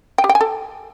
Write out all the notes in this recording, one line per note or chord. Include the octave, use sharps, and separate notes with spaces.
G5
G4
G5
G#5
A4